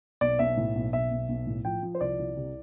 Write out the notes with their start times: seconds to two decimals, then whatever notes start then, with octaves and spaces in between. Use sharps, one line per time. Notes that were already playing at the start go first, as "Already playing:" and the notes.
0.21 B1 D5
0.39 B1 E5
0.57 A2
0.75 B1
0.93 B1 E5
1.11 B1
1.29 B1
1.47 A2
1.65 F3 G5
1.83 F3
1.95 C5
2.01 C2 D5
2.19 C2
2.37 C3